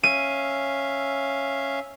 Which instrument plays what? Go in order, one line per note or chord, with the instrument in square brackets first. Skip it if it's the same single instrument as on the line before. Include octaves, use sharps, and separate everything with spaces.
[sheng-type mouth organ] C#4 E5 F5 [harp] D#7